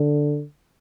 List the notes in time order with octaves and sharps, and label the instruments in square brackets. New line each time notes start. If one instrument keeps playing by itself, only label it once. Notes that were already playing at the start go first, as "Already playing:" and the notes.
Already playing: [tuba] D3